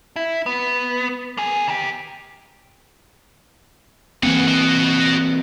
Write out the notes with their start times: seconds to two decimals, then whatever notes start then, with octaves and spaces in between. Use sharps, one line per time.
0.16 E4
0.46 B3
1.37 A#3 G#4
1.68 D#3 G4
4.23 E3 A#3 C4 G#4 F#5
4.48 F#4 D#5